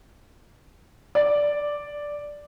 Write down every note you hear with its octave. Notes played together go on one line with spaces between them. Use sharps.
D5